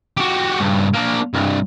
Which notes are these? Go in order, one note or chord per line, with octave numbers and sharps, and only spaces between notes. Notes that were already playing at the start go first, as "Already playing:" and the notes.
F#4 G4
G2 C#3
A#3 D4
C2 G2